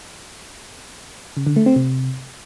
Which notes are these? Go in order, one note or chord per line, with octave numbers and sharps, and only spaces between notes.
C#3
D3
A3
C4
C3